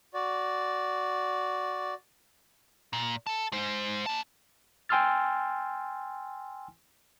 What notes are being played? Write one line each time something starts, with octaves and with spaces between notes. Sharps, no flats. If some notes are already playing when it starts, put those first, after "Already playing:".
F#4 D5
A#2
A4 A5
G#3 C5
A#3 A5
G5 G#5 C6 E6 F6 A6